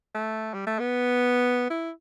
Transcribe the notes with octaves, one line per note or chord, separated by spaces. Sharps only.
A3
G3
A3
B3
E4